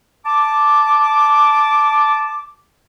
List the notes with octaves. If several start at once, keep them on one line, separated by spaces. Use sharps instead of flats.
A5 D6